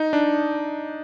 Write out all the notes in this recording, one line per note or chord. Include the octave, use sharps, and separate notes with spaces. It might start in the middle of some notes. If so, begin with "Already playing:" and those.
Already playing: D#4
D4